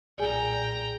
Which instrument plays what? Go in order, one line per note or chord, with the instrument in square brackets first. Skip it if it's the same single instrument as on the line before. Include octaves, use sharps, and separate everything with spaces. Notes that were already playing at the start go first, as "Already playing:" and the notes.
[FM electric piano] B1 G#4 [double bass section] A#2 [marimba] D5 G#5 [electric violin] G5 A#5